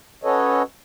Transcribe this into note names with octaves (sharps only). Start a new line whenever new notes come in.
C#4 F#4 A4 B4 C#5 D#5